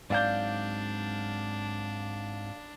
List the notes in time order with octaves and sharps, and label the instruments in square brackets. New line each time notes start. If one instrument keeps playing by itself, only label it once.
[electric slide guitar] G#2 F#3 C4 [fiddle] D4 [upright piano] D5 F5 G6